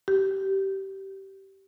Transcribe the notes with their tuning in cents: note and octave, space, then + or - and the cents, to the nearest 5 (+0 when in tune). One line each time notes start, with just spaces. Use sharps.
G4 -20